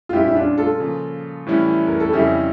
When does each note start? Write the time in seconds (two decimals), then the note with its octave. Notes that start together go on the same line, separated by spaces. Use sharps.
0.09 F4
0.13 A#2 G3 C#4 E4 G4
0.28 E4
0.35 D4 F4
0.58 F4 A4
0.80 C#3 F3 A#3
1.46 A2 E3 G3 C#4 E4
1.87 A#4
2.00 A4
2.13 F2 C#3 G3 C#4 E4 G4